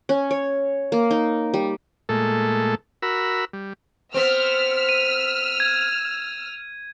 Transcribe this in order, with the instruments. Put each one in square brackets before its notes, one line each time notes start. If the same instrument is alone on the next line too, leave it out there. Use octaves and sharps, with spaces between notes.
[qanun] C#4
C#5
A#3
D#4
G3
[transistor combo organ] A#2 G#3 A3 A4
F#4 A#4 B5 E6
G3
[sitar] B3 C4 [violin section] E6 F6
[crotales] D#7
G#6